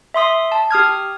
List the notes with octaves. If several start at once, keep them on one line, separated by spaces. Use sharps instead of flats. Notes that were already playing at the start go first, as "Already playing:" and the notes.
E5 C6 D#6 B6
A5
G4 D#6 F6 G#6